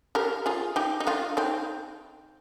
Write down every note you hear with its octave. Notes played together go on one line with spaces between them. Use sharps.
G4 A#4
F4 G#4
D#4 G4
D#4
D4 F4
C4 D#4